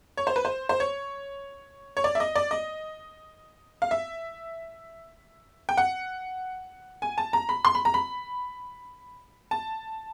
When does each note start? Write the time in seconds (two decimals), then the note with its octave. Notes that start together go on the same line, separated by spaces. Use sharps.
0.17 C#5
0.27 C5
0.36 B4
0.45 C5
0.69 C5
0.80 C#5
1.97 C#5
2.04 D5
2.15 E5
2.20 D#5
2.36 D5
2.51 D#5
3.82 F5
3.91 E5
5.69 G5
5.77 F#5
7.02 G#5
7.18 A5
7.33 A#5
7.49 B5
7.65 C6
7.75 B5
7.85 A#5
7.94 B5
9.51 A5